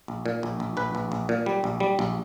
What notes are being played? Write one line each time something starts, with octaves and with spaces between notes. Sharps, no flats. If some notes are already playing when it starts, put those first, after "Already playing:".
A#1
A#2
A#1
A#1
A#1 B4
A#1
A#1
A#2
G3
A#1
G3
A#1